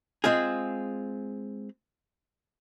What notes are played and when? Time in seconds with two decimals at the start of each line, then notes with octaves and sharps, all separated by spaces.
0.24 G#3 C4 F4 G#4